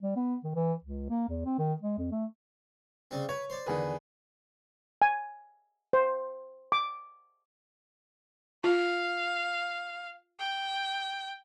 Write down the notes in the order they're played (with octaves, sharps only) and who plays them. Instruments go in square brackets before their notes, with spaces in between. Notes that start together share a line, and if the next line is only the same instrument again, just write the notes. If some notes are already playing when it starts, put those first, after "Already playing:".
[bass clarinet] G3
B3
D#3
E3
C#2
A#3
E2
C4
D#3
G#3
F2
A3
[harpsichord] C#3 G3 C4
[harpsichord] B4 [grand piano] C#5
[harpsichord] C5 D5
[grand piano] E2 G#4 B4 [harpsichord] D3 D#3
[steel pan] G#5
C5
D6
[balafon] F4 [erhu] F5
[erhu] G5